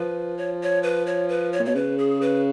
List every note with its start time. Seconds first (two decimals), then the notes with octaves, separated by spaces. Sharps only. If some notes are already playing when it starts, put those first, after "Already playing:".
Already playing: F3 B4
0.38 C#5
0.63 C#5
0.83 B4
1.07 C#5
1.29 B4
1.53 C#5
1.60 A#2
1.65 B2 C#5
1.75 C#3 B4
1.98 G#4
2.21 B4